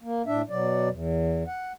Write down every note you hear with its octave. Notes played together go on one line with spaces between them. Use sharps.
A#3
A2 D4 E5
B2 F#3 D5
E2
F#5